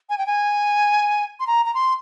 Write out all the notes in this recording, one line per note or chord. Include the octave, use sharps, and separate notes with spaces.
G#5
G5
G#5
C6
A#5
A#5
C6